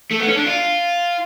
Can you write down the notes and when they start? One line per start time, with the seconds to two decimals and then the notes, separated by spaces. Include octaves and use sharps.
0.11 A3
0.20 B3
0.28 C#4
0.37 D4
0.46 F4